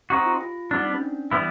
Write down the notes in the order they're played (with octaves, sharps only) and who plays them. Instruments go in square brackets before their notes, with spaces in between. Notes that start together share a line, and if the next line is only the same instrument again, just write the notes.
[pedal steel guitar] C4 D#4 F#4 [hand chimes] G4
[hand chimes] F4
F4
[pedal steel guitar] G3 B3 D4 [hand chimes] D#4
[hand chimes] C4
C#4
D4
[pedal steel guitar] E3 G3 B3 E4